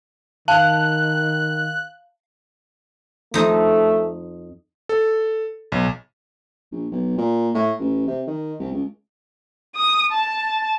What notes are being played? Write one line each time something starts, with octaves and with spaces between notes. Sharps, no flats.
D#3 F5 A5 F#6
F2 A3 D#4
A4
B1
A#1
B1
A#2
A2
A1
C3
D#3
C2
C#2
D#6
A5